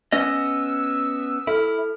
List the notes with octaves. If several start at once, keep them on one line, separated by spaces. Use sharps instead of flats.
B3 C#4 D#5 E6
E4 A4 F6